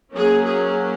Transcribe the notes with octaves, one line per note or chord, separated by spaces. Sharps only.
F#3 A#3 C#4 G#4
G#4